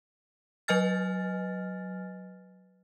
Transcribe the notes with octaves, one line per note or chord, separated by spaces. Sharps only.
F#3 B4 D#5 G#5 F6 A6